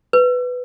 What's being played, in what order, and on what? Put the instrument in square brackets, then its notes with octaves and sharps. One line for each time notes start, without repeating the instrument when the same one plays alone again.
[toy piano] B4